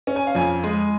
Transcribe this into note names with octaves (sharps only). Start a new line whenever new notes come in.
C#4
G#5
F5
F2 G#5
G#3